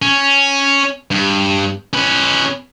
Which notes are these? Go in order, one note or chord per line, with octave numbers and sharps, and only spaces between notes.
C#4
G2
C#4 B4